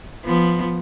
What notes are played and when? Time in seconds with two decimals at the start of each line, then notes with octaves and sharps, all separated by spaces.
0.24 F3 B3